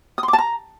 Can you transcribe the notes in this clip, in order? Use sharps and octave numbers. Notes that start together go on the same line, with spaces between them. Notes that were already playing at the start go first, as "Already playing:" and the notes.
D#6
C6
D6
A5
A#5